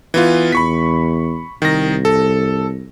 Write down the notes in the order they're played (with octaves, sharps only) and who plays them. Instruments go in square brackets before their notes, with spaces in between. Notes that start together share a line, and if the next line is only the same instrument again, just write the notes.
[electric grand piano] E3 B3 F4
[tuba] E2 [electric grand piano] B5 C#6 B6
[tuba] C2 [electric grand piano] D#3 A#6
[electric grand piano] A4